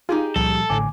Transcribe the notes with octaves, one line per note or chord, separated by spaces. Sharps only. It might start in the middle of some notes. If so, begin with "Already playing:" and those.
D#4 F4 G4 G#4
C#2 A#2 F3 G3 A4
A1 A2 D3 G#5 D6